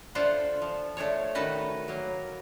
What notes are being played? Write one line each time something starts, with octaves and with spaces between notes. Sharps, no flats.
D4 F4 A4 C5 E5 F#5
F3
A3 D4 A4 C#5
D#3 F#4 A4 B4 D#5
F#3 A#3